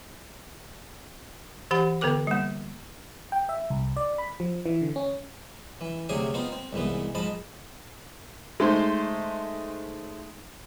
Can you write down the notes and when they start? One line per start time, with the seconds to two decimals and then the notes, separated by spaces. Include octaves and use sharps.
1.71 E3 G4 F#5 B5
2.01 D3 B3 A4 A#4 D6
2.27 G3 A#3
3.32 G5
3.49 E5
3.70 C2
3.97 D5
4.18 B5
4.40 F3
4.66 E3
4.82 D3
4.96 C#4
5.81 E3
6.09 D2 C3 F#3 G4 G#4 G#5
6.34 B3 C4 D#4 F4
6.52 C4
6.73 C2 G#2 E3 B3
7.15 G#2 F3 D#5 A5 B5
8.60 G#3 A3 D#4 C5